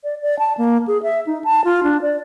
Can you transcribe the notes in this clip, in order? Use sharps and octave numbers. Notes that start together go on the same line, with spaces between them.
D5
D5
A5
A#3
G#4
E5
D#4
A5
F4
D4
D5